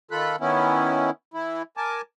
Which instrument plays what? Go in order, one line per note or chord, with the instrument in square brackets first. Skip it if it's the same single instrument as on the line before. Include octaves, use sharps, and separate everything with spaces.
[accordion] D#3 F4 A4 B5 F#6
D#3 B3 C#4 E4
E3 E4
A#4 G#5 A5 D6